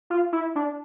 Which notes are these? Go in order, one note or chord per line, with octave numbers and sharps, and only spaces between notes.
F4
E4
D4